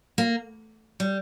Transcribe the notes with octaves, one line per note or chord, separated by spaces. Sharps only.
A#3
G3